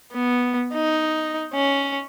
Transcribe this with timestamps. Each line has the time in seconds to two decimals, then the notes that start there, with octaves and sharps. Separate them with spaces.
0.13 B3
0.74 D#4
1.54 C#4